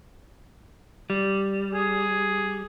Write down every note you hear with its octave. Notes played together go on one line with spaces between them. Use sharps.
G3
G#4